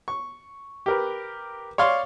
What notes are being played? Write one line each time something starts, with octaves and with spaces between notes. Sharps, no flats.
C#6
G4 A#4 B4
C#5 D5 F5 C6